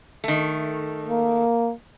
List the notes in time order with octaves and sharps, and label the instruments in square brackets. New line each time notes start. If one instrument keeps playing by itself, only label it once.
[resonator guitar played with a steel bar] D#3 A3
[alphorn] A#3